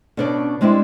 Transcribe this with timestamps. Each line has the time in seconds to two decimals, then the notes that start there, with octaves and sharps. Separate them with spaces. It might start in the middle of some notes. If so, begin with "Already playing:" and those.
0.17 B2 C#4 D4 B4 D5
0.61 G3 G#3 C4 D4 E4